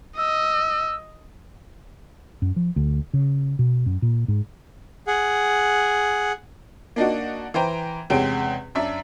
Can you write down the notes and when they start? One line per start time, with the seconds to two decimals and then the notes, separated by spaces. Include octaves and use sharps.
0.18 D#5 E6
2.42 F#2
2.56 F3
2.76 D2
3.14 C#3
3.59 B2
3.86 F#2
4.02 A#2
4.28 G#2
5.07 G#4 F#5
6.96 A#3 D4 D#4 F#4
7.54 E3 C5 G5 A#5
8.10 E2 C3 G#3 C#4 G4 D7
8.75 F#2 D4 E5